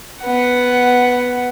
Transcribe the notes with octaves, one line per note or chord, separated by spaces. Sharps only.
B3 F#5